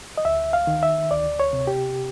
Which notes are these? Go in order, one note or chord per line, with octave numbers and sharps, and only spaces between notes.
D#5
D2 E5
F5
D#3
E5
D2 D5
C#5
C3
G4